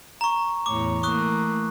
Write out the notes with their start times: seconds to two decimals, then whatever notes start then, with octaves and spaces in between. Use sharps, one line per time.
0.21 A#5 C#6
0.66 E2 A2 C#5 D6
1.03 E3 A3 A#3 C#6 D#6 F#6